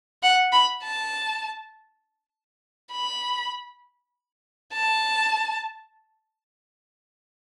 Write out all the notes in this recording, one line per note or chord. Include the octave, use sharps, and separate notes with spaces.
F#5
B5
A5
B5
A5